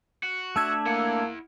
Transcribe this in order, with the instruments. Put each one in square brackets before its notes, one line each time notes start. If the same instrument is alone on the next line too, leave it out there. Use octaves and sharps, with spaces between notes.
[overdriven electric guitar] F#4
[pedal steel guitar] A3 D4 E5 [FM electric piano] A5 E6 G#6
[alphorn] A#3 [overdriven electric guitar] E4 F#5